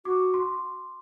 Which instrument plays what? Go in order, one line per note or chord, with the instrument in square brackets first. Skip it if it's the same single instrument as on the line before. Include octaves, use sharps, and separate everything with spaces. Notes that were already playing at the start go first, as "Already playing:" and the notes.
[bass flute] F#4 [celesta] D6
[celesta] C6